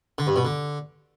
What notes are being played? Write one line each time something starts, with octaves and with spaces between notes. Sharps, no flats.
D3
G2
B2
D3